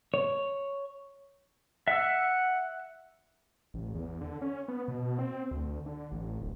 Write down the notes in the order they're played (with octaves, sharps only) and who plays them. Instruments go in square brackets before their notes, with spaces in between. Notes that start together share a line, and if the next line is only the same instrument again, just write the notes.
[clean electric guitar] C#5
[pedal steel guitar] E5 E6 [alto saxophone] F#5
[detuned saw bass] A1
E2
D3
C#4
B3
B2
C4
D2
D3
A1
D1